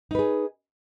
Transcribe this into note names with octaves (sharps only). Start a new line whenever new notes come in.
D#4 G#4 B4